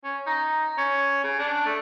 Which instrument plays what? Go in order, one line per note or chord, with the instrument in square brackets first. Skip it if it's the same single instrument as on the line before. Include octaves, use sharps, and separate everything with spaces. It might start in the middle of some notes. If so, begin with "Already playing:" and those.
[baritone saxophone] C#4
D#4
C#4
C#3
D4
A3